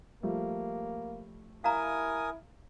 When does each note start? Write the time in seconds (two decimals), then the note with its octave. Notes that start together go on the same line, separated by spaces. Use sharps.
0.23 F3 G3 A3 A#3
1.64 E4 A#4 F5 G#5 A#5 D#6